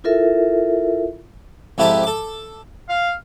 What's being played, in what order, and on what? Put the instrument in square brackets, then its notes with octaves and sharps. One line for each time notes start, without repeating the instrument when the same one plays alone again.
[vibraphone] E4 F4 A4 A#4 E5
[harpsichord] F2 G#2 E4 G4 A5 D6
A4 D6
[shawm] F5